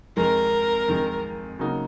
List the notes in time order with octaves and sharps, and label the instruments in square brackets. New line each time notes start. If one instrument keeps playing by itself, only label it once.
[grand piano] F2 D#3 G#3 [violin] A#4
[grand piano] F2 D#3 G#3
C#3 F#3 A#3 D#4 F#4